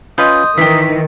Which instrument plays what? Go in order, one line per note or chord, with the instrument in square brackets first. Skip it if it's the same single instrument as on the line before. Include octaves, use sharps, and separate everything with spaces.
[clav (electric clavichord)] C#4 F4 B4 [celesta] D#5 C6 G6 [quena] D#6
[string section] D#3 [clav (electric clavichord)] E3 G5 [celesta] B6